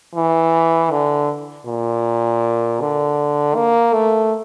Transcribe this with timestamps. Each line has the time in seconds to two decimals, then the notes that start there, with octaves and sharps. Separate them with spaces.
0.15 E3
0.91 D3
1.66 A#2
2.81 D3
3.55 A#3
3.94 A3